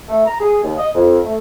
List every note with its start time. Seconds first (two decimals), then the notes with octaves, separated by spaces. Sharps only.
0.08 A3
0.26 A#5
0.40 G#4
0.63 D#2
0.77 D#5
0.95 F2
1.24 A3